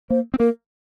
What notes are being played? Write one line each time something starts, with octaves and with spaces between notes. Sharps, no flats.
A#3 C5
C4
A#3 A#4